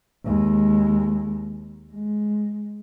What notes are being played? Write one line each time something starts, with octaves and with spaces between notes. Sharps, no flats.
D#2 G#3
G#3